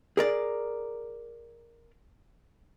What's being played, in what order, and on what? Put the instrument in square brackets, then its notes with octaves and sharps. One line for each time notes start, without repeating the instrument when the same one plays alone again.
[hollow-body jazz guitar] G#4 A#4 D5